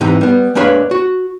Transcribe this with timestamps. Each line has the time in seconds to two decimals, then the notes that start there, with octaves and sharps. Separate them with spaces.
0.01 G#2 C3 E3 D#4
0.21 G3 B3
0.55 G#3 A#3 D4 B4 C#5 F5
0.91 F#4